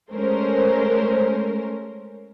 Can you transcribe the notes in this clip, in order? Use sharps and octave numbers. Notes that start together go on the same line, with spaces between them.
G#3 A3 C#4 A#4 C5